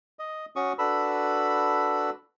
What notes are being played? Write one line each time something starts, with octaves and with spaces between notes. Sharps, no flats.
D#5
C#4 F#4 C#6 D#6
D4 F#4 A4 B4 B5 E6